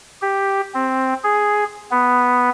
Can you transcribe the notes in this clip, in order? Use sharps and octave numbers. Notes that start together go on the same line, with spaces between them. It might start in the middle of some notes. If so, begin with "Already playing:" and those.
G4
C4
G#4
B3